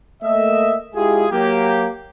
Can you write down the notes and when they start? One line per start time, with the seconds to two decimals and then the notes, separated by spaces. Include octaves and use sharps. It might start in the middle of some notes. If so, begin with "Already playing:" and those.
0.23 A3 A#3 D#5 E5
0.95 G#3 E4 F4 G4 G#4
1.32 F#3 A#3 G4